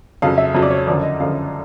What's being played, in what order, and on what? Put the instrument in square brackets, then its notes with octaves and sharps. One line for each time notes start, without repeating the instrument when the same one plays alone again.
[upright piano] F2 C#3 F#3 F5
E5
F2 C#3 F#3
D5
C#5
F#2 D3 F3 D5
D#5
F#2 D3 F3 F5